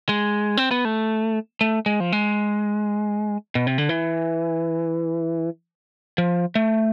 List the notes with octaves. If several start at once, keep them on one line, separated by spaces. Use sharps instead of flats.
G#3
C4
B3
A3
A3
G#3
F3
G#3
B2
C3
D3
E3
F3
A3